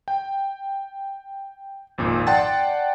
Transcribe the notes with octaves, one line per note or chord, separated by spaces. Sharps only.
G5
G#1 F2 A#2
D5 F#5 G5 A5 C6 A6